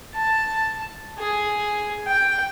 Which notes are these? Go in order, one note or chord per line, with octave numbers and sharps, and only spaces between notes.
A5
G#4
G5